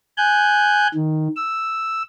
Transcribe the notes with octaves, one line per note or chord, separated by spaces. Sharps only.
G#5 F#6 G6
D#3
E6